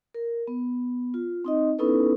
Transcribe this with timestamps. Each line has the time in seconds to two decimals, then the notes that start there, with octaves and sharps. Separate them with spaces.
0.14 A#4
0.48 B3
1.14 F4
1.45 C4 D#4 D#5
1.79 B3 C#4 D#4 E4 A4 B4